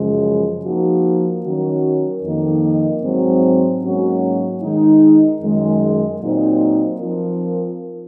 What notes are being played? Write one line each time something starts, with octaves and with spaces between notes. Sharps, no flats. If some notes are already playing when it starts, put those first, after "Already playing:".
Already playing: F#2 C#3 F3 G#3
F3 A#3 D#4 F#4
D#3 F#3 C#4 F#4 A#4
F2 D#3 A#3 D#4
G#2 F#3 C4
G#2 F#3 A#3 C#4 F#4
D#3 G#3 D#4
F#2 D#3 G#3
A#2 F#3 C4 D#4
F3 C4 F4 A#4